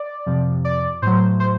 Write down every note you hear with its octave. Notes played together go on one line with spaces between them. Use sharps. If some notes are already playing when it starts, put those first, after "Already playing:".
Already playing: D5
F2 C3 F3
D5
A2 F#3 C5
C5